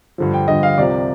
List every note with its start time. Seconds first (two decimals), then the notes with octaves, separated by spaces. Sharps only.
0.18 G2 D3 F3
0.34 G5
0.48 G2 D3 F3 D#5
0.63 F5
0.78 C2 C3 F3 D5